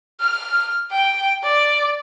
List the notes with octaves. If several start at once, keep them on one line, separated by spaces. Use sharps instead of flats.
F6
G5
D5